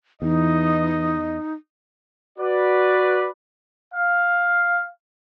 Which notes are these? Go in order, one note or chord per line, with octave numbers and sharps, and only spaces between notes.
E2 E3 D#4 D#5
F#4 B4 D5
F5